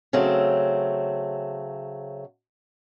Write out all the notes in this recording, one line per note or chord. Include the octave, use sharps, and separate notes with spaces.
C#3 F#3 A3 C4